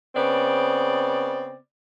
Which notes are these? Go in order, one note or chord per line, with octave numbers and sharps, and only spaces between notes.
C#3 B3 C4 D5